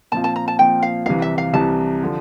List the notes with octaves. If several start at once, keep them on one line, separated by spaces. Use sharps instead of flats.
A#2 F3 C4 F4 A5
A5
A#5
A5
A#2 F3 C4 F4 G5
F5
C2 C3 E3 F5
E5
F5
C2 C3 E3 A5
D3 F3